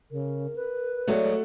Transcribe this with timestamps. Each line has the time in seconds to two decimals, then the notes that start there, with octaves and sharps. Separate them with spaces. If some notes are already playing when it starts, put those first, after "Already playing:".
0.11 C#3 A#4
0.56 B4
1.08 F#3 G#3 A3 B3 F#4 A4 D5